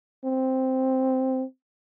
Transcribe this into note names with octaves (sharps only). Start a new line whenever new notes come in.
C4